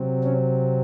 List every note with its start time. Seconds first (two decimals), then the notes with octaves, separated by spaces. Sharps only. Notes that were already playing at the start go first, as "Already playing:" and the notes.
Already playing: C3 F#3 C4
0.24 C#4